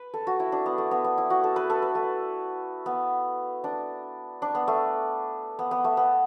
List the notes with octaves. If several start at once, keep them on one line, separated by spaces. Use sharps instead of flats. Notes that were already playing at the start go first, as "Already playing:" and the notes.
Already playing: B4
A4
F#4
E4
D4
B3
A3
B3
B3
E4
F#4
A4
B4
A4
B4
A3
B3
D4
D4
B3
A3
B3
B3
A3
B3